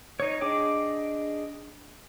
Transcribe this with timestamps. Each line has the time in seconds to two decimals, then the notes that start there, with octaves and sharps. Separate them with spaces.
0.20 D#4 C#5
0.41 D4 G#4 D#5 G5 D6